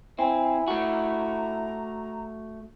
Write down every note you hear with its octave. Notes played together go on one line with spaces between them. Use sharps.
C4 E4 G#5
A3 F#4 A#5